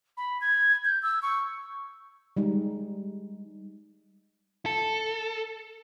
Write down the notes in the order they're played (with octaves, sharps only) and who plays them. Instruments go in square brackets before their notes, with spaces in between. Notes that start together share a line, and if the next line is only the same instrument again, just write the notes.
[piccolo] B5
G#6
G6
E6
C#6
[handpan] G3 G#3 D#4
[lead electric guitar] A4